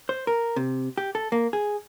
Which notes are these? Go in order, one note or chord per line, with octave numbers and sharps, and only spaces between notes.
C5
A#4
C3
G4
A4
A#3
G#4